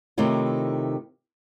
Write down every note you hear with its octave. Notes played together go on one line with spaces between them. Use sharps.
C3 D#3 A3 E4 F4 C#5